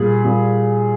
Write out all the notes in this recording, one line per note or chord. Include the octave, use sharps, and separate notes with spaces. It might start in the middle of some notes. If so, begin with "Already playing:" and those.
Already playing: A#2 G3 G#4
A#2 G3